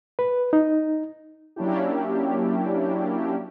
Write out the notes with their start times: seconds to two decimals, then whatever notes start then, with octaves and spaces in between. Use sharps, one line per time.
0.19 B4
0.53 D#4
1.56 F#3 A#3 C#4 D4 E4 G4